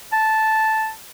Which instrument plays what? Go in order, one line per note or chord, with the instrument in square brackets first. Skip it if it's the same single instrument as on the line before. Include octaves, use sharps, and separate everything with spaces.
[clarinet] A5